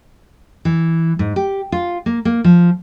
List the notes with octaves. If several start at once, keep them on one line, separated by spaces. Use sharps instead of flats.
E3
G#2
G4
F4
A#3
A#3
F3